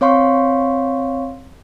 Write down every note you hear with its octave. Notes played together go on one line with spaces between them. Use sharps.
C4 C#5 F5 C6 C#6